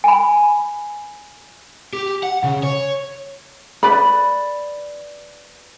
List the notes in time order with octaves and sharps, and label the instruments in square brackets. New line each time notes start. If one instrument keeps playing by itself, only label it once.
[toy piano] G#5 B5
[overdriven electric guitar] G4
F#5
C#3
C#5
[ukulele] B4 D5 B5